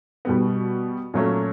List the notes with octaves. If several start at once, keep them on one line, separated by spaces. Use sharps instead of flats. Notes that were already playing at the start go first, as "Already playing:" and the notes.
B2 G3 B3
A#2 F#3 A3 C#4